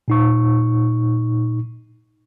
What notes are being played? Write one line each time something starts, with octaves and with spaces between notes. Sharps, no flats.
A#2 D#4 C#6